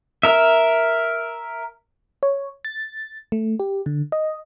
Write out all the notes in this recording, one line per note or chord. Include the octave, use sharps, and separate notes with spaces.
A#4 E5
C#5
A6
A3
G4
D3
D#5